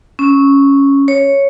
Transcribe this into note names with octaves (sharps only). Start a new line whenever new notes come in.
C#4
C#5